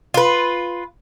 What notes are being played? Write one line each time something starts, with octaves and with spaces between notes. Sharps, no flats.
F4 B4